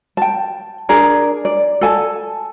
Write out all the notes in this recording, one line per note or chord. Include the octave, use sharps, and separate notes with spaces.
G5 A5
D4 G#4 A#4 D5
D5
A4 G#5 A5